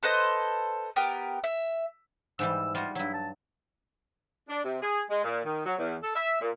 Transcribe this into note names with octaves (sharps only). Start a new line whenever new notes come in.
A4 B4 C5 D#5
B3 G4 A#4
E5
G#2 E3 G3 E6
G3 F4 F#4
G2 F#3 E4
A5
D4
C3
G#4
G#3
A#2
D#3
F#3
E2
A4
E5
A#2